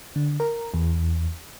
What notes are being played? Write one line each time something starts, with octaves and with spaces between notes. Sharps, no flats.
D3
A#4
E2